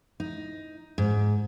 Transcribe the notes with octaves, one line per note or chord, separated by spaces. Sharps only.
D#4
G#2